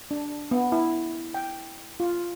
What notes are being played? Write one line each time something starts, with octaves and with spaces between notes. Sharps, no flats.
D4
B3
E4
G5
F4